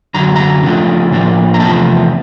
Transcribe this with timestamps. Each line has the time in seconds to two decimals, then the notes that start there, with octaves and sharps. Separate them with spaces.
0.14 F#2 D3 F#3 A#5
0.36 A#5
0.63 C#3 F3 A3 D4
1.11 A2 F3 A#3 D4
1.54 A#5
1.60 E2 C3 F3 A3 C4 A5